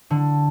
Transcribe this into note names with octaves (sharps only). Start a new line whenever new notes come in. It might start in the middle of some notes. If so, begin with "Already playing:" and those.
D3